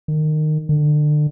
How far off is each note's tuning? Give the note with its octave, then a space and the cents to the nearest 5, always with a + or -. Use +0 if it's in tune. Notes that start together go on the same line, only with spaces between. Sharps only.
D#3 -20
D3 +30